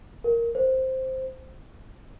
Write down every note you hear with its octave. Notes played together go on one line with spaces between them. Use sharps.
A#4
C5